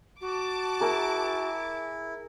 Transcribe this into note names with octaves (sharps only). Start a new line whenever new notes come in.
F#4 A5 D6
E4 G#4 A#4 G#5